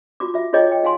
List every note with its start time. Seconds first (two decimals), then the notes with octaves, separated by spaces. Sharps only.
0.20 F4 F#4 D6
0.34 F4 E5
0.53 E4 F4 G#4 C#5 D#5 G5
0.72 G5
0.84 D#4 F5 G#5 C6